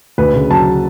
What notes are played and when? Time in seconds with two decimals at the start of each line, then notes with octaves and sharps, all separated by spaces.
0.18 D2 B4
0.34 C#3
0.50 F#3 A5